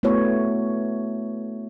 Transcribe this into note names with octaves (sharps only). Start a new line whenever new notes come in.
A3 B3 E4 F#4 C#5